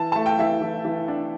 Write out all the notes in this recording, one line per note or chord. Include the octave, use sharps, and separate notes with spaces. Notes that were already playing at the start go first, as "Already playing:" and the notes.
Already playing: E3 A5
A3 A5
G5
E3 E5
E3
E3
D4